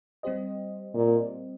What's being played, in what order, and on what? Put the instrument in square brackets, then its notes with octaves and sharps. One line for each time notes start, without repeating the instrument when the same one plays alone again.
[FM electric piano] G3 C4 G4 C5 D#5
[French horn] A#2